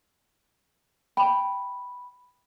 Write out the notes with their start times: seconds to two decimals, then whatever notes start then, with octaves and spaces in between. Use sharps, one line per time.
1.17 G5 B5